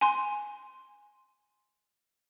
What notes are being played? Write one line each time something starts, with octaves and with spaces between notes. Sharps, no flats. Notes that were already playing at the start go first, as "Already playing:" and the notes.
G#5 C6